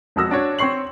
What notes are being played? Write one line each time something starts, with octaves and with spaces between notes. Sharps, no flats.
E1 F2 F#4 E6 A#6
D4 F#4 C#5
C4 C#5 C#6 C7 F#7